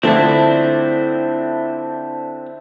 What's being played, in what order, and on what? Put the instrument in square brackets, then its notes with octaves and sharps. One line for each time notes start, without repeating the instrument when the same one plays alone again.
[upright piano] D3 F3 A3 [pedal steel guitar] C4 D4 E4